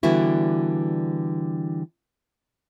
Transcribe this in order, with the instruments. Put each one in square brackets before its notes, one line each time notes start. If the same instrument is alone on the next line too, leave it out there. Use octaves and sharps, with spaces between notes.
[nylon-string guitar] D3 E3 G3 B3 E4 F#4